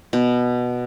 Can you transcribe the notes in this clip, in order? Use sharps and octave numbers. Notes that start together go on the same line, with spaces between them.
B2